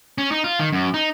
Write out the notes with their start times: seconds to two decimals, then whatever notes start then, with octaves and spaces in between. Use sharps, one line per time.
0.18 C#4
0.31 D#4
0.44 F4
0.60 D#3
0.72 F#2
0.94 D#4